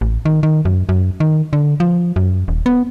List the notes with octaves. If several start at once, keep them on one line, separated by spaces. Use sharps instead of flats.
A1
D#3
D#3
F#2
F#2
D#3
D3
F3
F#2
D#1
B3